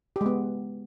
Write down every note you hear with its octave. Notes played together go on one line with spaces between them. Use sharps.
G4
G#3
B3